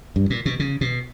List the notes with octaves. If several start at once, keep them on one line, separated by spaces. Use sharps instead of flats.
G2
A#2
B2
C#3
B2